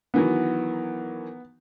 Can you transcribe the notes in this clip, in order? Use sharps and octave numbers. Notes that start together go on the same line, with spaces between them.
D#3 E3 F#3 B3